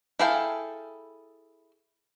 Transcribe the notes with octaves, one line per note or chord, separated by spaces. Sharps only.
E4 G#4 A4 F5 G5